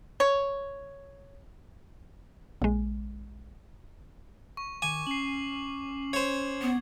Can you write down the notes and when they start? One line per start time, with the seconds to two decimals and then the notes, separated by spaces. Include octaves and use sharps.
0.20 C#5
2.62 A#1 G#3
4.57 C#6
4.82 D#3 G#5 D6
5.07 C#4 C7 F#7
6.13 C5 C#5 G#6
6.62 B3